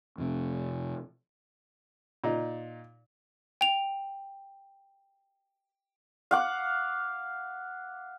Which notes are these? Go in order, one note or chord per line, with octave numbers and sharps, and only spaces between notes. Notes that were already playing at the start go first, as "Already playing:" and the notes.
F2 C3
A#2 D#4
G5 F7
F5 F#5 D6